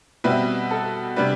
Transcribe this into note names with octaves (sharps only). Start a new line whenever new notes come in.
B2 G3 C4 E4 B4
A4
C3 G3 D4 B4